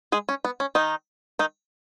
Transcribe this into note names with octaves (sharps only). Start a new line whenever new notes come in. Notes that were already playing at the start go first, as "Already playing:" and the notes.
G#3 G#4
C#4
B3
C#4
D#3 D#4
D#3 D#4